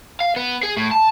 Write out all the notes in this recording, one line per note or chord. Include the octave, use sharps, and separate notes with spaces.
F5
B3
G#4
A2
A5